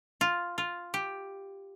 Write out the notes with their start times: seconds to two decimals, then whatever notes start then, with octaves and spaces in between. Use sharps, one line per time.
0.21 F4
0.58 F4
0.94 G4